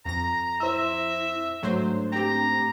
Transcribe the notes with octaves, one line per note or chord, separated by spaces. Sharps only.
F2 A#5 A#6
E4 C5 E5 E6
G#2 F#3 A3 D4 C5
C4 G4 A#5